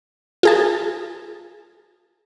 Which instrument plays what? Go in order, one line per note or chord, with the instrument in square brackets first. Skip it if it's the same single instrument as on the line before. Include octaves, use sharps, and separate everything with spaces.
[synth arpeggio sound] F4 G#4 A5